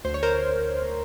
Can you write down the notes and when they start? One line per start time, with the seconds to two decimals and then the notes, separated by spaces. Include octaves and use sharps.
0.05 D2 C5
0.14 C#5
0.23 A#4 C5